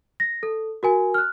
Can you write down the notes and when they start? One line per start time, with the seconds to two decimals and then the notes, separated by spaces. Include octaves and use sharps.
0.20 A#6
0.43 A4
0.83 F#4 A#4 G#5
1.14 F6 F#6